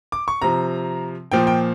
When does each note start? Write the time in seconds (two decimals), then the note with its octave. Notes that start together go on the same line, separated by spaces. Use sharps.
0.12 D6
0.28 C#6
0.41 C3 F3 A#5
1.32 A#2 F3 G5
1.47 G5